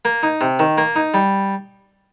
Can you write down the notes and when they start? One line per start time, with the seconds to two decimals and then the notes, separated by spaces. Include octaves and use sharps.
0.05 A#3
0.23 D#4
0.41 C3
0.59 D#3
0.78 A#3
0.96 D#4
1.14 G3